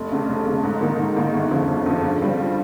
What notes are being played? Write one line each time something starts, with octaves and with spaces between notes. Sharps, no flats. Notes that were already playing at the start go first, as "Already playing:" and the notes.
Already playing: F1
F2 C#3
F1
F2 C#3
G#2
D#3 A#3 D#4
G#2
D#3 A#3 D#4
G1
F2 C#3 F3
G1
F2 C#3 F3
G2
G3 C4 F4